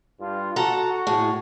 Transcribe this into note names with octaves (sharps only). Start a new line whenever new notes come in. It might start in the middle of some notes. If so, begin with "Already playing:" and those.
G2 F4
F#4 A4 F#5 A#5
A2 G#4